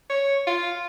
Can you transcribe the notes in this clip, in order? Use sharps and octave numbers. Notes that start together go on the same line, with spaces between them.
C#5
F4